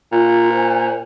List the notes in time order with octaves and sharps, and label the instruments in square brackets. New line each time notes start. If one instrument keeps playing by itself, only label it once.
[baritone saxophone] A#2 [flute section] F4
[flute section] C5 G#5